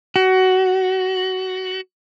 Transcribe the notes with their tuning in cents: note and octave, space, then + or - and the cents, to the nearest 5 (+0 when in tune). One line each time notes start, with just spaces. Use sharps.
F#4 +20